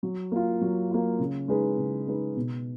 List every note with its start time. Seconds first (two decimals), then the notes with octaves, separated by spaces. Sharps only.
0.03 F#3
0.32 A#3 F4
0.61 F#3
0.91 A#3 F4
1.19 C#3
1.48 G#3 D#4 G#4 B4
1.78 C#3
2.07 G#3 D#4 G#4 B4
2.36 B2